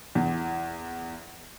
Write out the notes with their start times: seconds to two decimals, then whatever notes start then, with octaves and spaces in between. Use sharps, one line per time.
0.15 E2